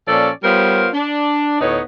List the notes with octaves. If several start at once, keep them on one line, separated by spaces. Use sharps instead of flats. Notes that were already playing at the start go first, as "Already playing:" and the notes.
A#2 F3 C#4 A4 D5
G3 B3 F4 A#4 C5 C#5
D4
D2 A2 B3 D#4 C#5